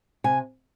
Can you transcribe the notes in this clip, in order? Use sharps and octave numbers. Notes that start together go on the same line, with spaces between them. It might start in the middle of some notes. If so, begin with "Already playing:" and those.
C3 G#5